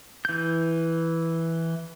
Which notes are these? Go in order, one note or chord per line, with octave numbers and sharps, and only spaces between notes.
E3 G6